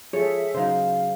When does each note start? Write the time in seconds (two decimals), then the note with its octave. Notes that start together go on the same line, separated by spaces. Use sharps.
0.13 F3 G#4 A4 C#5 E5
0.54 C#3 F#3 D#4 C5 F5